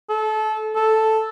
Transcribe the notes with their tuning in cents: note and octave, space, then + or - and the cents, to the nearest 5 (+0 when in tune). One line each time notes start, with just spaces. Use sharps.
A4 -25
A4 +0